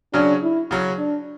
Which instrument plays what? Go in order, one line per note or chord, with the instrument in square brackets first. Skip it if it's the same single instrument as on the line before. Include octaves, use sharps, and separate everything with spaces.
[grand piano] C#3 F#3 C#4 [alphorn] D4
[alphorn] E4
[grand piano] C#3 F#3 C#4
[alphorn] D4